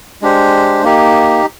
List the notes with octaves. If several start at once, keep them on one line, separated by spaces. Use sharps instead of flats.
G#3 D4 G4 C5
A#3 D#4 G4